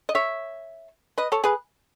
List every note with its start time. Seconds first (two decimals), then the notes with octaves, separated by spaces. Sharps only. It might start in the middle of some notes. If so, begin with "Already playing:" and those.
0.09 D#5
0.15 C#5 E5
1.18 B4 D#5
1.32 A4 C#5
1.44 G#4 B4